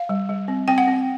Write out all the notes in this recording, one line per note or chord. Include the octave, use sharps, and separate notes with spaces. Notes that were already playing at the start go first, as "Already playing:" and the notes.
Already playing: F5
G3
G3
C4
C4 G5
F#5
C4